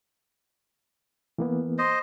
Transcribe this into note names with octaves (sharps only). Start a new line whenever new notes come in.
E3 A#3 B3
C5 D#5